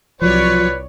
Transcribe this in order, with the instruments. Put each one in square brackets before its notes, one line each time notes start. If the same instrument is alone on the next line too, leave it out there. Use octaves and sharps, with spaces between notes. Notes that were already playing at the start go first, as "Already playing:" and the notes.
[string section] C2 C#5 D5 [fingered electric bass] F3 F#3 [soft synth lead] F4 [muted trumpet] B4